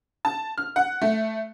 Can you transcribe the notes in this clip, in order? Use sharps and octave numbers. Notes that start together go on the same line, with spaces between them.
A5
F6
F#5
A3